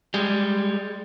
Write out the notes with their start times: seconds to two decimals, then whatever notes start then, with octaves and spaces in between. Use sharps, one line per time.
0.14 G3 G#3